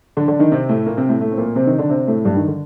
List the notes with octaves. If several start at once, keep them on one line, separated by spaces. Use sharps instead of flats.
D3 D4
D3 D4
D#3 D#4
C3 C4
A2 A3
A#2 A#3
C3 C4
A2 A3
A2 A3
C4
A#2 A#3
C3 C4
D#3 D#4
D3 D4
C3 C4
A2 A3
G2 G3
D#3
D3